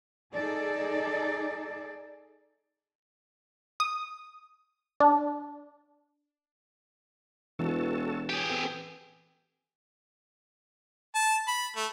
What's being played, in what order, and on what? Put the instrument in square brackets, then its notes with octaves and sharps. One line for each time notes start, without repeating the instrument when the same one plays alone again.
[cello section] D#4 G#4 A4 D5
[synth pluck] D#6
D4
[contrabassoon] E1 [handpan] E3 [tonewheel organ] F#4 A4 A5
[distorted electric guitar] G4 G#4 [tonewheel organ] C#5 G#5 A5
[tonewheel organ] B3 C4 A4
[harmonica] A5
B5
A3